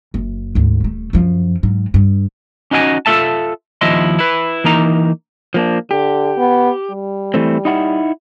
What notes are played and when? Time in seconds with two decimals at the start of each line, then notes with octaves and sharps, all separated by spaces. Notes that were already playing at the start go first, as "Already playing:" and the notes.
0.14 F#1
0.55 D2 G#2
0.80 D#1 A3
1.13 F#2 F3
1.63 G#2 F#3
1.94 G2
2.71 C#4 D#4 F#4 D#5 E5 G#5
3.06 F4 A4 E5 A5
3.81 D#2 F3 E4 D#5 E5 C6
4.19 E4 B4
4.64 E3 A#3 D#4 A#5
5.54 F3 A#3 D4
5.91 D3 G4
6.38 B3
6.91 G3
7.34 E3 A3 C4
7.65 D#4 E4 F#5